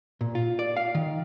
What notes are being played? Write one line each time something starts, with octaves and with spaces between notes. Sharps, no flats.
A#2
F4
D5
F5
D#3